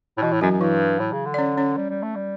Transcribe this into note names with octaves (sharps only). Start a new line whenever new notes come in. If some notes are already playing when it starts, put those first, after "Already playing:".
A2
B2 E3 E4
A2
F#2 F#3 F#4
F#2
G2 E3 E4
A2
C#3
D3
D5
C#4 C#5
C#4 C#5
G3
G3
A3
G3